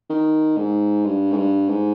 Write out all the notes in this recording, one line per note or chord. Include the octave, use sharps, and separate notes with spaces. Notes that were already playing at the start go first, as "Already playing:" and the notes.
D#3
G#2
G2
G#2
G2
G#2